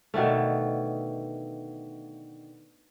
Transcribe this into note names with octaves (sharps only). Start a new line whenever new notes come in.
B2 D3 D#3 A3